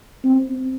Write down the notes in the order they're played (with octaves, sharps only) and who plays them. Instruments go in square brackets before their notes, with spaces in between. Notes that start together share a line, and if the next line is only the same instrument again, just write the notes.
[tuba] C4